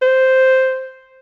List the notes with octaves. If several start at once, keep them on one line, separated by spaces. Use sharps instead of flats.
C5